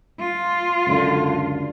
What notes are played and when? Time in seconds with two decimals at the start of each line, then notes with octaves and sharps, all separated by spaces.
0.20 F4
0.87 C#2 F#2 D3